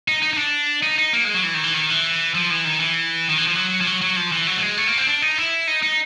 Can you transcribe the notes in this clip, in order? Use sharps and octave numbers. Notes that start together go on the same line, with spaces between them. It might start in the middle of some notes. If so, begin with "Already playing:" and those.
D#4
D#4
D#4
D4
D#4
D#4
A#3
G#3
F#3
E3
D#3
E3
D#3
E3
F3
E3
D#3
E3
D#3
E3
F3
F#3
F3
F#3
F#3
F3
E3
F#3
A3
G#3
A3
A#3
C4
D4
D#4
E4
D#4
D#4